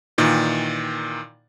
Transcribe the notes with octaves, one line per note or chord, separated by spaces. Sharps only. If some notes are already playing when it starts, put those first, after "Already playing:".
A#2 D#3 E3